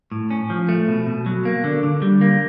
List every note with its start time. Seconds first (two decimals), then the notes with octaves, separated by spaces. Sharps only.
0.12 A2
0.31 C#4
0.50 F3
0.69 A3
0.88 B2
1.07 B2
1.26 F#3
1.45 A#3
1.64 D3
1.83 D3
2.02 G3
2.21 A#3